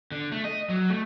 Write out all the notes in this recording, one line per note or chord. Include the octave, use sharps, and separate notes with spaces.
D3
A3
D#5
F#3
A3